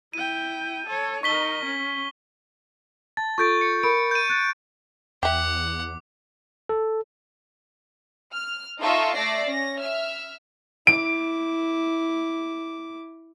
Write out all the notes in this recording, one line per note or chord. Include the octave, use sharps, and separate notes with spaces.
E4 G5 D#7
A4 C#5
D#4 A#4 C#6 B6 G7
C#4
A5 A6
F4 A4 C#6 G6 A6 D7
C#7
A#4 B5 D7
G6 D#7
F#6 A6
E2 E5 F#5 G5 D6
A4
F6
D#4 F4 A4 D#5 E5 C#6
A3 D5 E5 D6 A#6 C7
C#4 A#6
E5 F6
E4 D6 D7